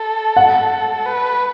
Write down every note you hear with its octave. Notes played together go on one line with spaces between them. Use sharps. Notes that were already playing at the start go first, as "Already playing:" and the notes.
Already playing: A4
F#5
B4